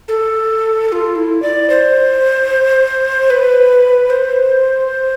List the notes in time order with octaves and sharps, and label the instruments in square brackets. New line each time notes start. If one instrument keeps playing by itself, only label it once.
[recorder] A4
A4
F4
E4
D5
C5
B4
C5